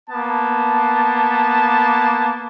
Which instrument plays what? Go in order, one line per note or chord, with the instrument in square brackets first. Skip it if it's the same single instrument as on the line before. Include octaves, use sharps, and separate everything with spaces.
[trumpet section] A#3 B3 A5